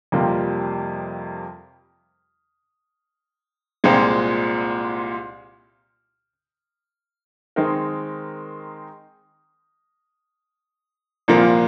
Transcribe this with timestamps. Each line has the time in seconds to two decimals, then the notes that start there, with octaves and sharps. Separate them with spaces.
0.12 F2 C3 G3 A#3 F4
3.84 C2 A#2 G#3 C4 F4
7.56 D#3 G#3 C4 D#4 A#4
11.28 C2 A#2 F3 A#3 F4